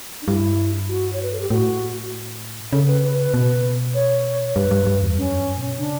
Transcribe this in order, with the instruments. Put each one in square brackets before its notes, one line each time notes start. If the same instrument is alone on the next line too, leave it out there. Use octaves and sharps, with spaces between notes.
[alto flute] D4
[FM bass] G2 [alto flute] E4
[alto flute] F#4
C#5
B4
A4
G4
[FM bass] A2 [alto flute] F#4
[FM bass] C#3 [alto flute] A4
[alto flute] B4
B4
B4
[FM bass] B2
[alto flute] C#5
[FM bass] G2 [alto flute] B4
[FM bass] G2
G2
E2
[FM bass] F#2 [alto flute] C#4
[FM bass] G2
B2
[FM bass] C#3 [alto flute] D4